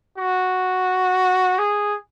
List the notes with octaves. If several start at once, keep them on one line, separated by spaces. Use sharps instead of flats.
F#4
G#4